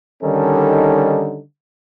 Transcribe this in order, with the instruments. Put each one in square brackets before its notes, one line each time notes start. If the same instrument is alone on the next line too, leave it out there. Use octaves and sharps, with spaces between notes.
[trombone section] D3 D#3 G3 C#4 D#4 A4